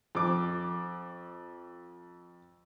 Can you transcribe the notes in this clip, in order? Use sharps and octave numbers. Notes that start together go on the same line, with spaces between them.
F2 D6